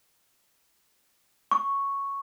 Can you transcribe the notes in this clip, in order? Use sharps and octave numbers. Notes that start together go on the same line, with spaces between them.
C#6